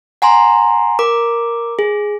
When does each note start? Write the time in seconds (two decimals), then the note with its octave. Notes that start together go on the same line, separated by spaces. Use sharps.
0.22 F#5 G#5 A#5 C6
0.99 A#4 D6
1.79 G#4